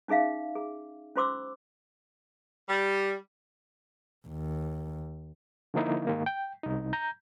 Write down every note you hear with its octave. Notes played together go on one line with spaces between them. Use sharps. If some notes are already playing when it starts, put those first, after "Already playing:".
C#4 D#4 G#4 E5 F5
G#4
C#4 F4 C5 C6 D6 E6
G3
D#2
D3 F3 A#3 D#4 E4
G#2 D#3 A#3
G5
C2 D#4
A#5 G6